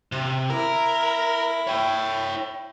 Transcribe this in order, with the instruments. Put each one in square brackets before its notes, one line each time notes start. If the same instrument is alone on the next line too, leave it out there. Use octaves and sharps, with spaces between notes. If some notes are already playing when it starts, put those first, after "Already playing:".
[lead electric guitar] C3
[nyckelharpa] E4 [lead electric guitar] A#4
[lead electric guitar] C#5 G5